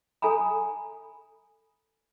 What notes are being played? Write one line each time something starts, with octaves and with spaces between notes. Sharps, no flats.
A4 G#5 A#5 B5